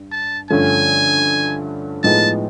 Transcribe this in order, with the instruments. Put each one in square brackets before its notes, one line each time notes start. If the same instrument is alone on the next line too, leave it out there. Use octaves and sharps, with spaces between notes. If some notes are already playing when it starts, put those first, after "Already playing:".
Already playing: [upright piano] G2
[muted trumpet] A5
[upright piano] G2 D3 F3 A3 C#4 [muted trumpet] G#5
[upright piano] A2 F3 G#3 B3 D#4 [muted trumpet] A5